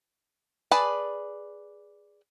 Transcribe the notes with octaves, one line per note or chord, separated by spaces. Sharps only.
G#4 B4 D5 A5